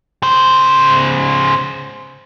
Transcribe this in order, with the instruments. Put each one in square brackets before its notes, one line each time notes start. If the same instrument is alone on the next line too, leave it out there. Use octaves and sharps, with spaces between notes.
[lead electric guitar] C#3 C5